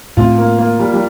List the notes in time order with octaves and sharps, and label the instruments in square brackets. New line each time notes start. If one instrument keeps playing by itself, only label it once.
[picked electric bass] A2 A3 C4 [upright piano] F4
[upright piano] A#3
A#3
G3
G3